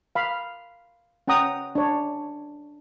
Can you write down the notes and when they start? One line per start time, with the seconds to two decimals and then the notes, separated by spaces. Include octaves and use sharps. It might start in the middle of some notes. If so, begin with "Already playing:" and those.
0.15 F5 B5
1.28 C#4 F#5 G5 A#5 D#6
1.75 D4 C#5